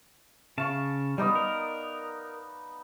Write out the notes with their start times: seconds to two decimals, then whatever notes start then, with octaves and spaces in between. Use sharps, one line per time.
0.58 C#3 F5 A5 C#6
1.18 G3 B3 D#4 D5
1.35 A#4